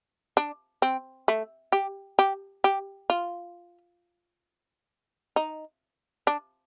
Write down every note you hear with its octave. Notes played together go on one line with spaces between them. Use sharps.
D4
C4
A3
G4
G4
G4
F4
D#4
D4